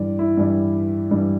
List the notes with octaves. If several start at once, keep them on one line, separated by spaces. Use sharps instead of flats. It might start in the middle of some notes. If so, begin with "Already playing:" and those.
Already playing: G2 E3 G3 D5
E4
G2 E3 G3
G2 E3 G3